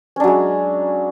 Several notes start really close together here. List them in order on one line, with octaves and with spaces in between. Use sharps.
C#4 D4 F#3 G#3